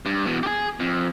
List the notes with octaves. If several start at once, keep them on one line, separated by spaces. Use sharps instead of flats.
G2
E2 B2
G4 G#4
F2